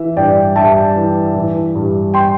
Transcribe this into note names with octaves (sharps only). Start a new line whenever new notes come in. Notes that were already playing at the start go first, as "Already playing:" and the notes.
Already playing: E3 E5
G2 D5 G5
G2 E5 A5
E3
E3
G2
G5 C6